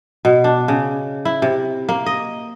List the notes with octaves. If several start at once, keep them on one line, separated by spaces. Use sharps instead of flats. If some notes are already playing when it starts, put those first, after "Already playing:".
B2
D4
C#3
E4
C3
A#3
D#5